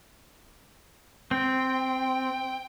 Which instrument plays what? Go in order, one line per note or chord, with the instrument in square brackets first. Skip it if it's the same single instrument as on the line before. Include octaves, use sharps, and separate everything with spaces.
[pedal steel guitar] C4 [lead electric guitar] G5